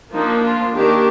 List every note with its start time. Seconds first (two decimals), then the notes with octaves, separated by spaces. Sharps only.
0.13 F3 A#3 D4 D#4
0.43 F4
0.74 D#3 A#3 D4 G4